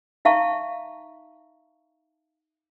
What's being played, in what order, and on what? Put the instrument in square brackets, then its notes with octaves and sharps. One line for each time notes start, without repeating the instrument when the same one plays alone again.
[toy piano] D#4 E5 F5 A5 A#5 C#6